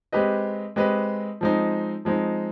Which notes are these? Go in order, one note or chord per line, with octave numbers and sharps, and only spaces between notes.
G#3 C4 G4 B4 D#5
G#3 C4 G4 B4 D#5
F3 G#3 C4 D#4
F3 G#3 C4 D#4